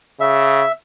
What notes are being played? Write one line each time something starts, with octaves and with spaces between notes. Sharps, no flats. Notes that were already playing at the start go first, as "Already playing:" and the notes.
C#3 E5